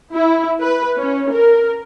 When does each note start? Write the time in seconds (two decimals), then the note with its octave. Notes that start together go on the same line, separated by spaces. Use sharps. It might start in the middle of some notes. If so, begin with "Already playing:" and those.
0.14 E4
0.60 B4
0.98 C#4
1.32 A#4